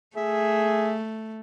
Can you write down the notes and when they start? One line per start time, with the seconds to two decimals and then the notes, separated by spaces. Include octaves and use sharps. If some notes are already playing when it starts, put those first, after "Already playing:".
0.16 A3 G#4 E5